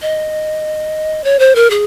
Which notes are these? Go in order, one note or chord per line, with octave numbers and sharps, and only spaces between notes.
D#5
C#5
C5
A#4
G#4